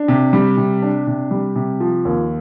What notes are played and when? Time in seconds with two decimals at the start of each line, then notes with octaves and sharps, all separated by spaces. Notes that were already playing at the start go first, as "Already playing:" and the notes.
Already playing: D4
0.08 C3
0.33 G3
0.57 C3
0.82 D4
1.07 C3
1.31 G3
1.56 C3
1.80 F3
2.05 D#2